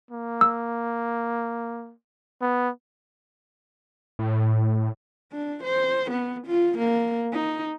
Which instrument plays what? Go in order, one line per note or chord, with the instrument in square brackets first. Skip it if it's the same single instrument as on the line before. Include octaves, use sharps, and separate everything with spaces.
[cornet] A#3
[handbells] E6
[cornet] B3
[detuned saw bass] A2
[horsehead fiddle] D4
C5
B3
F4
A#3
D#4